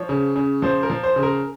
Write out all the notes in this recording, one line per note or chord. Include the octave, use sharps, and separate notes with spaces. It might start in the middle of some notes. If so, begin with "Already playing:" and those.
Already playing: F3 C#5
C#3
C#3
F3 C5
A#4
F3
C5
C#3
A#4